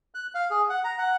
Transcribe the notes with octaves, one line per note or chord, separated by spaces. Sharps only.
F#6
F5
G#4
F#5
A#5
F#5